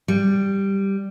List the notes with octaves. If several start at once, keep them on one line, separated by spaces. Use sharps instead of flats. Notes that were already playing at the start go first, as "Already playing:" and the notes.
G3